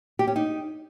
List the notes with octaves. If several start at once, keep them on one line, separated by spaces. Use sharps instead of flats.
G4
C#4
D#4